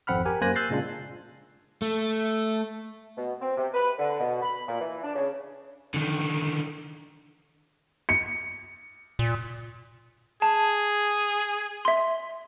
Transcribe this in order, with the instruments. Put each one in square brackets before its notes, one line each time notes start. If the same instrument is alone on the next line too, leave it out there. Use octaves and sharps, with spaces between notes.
[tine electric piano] G#1 F2 C4 F#5 B5 F6
G4 A#4 G#5
F#2 A#3 C5 G#5 F#6 A#6
E6 F#6 G6 A6 C7
A#2 C#3 G#3 D4 F4
[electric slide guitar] A3
[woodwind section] B2
C4
C3
B4
D3
B2
B5
A#2
E3
D4
C#3
[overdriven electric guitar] D3 D#3
[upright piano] C#7
[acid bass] A#2
[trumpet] G#4 [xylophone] A5
[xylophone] E5 C6